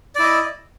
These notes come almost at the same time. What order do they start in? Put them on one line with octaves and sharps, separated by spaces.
D5 E4 D#5